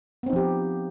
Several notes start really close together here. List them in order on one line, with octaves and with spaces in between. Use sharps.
B3 C4 D#4 F3 G4